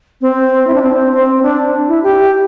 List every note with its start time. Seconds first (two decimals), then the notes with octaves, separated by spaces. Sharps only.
0.21 C4
0.67 E4
0.75 D4
0.82 C4
1.12 C4
1.43 D4
1.88 E4
2.03 G4